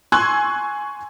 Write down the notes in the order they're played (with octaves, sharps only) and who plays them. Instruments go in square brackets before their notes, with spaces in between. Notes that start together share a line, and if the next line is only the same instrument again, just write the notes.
[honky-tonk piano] G#5 C6 C#6 E6 F#6 G#6